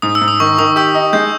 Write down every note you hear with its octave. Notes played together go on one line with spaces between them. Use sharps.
G#2 D#6
E6
G#2
D#6
D#3 C#6
D#3 D#6
G4 E6
D#4
G#3 G6